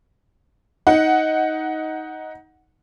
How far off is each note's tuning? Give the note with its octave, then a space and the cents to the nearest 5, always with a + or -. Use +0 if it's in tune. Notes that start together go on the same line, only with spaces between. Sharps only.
D#4 +15 F#5 +0